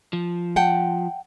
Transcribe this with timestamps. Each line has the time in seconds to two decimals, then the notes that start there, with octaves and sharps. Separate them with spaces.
0.13 F3
0.56 F#5 G5 A5